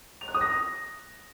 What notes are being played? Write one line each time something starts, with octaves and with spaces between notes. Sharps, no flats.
F7
F#6
D#6
A#6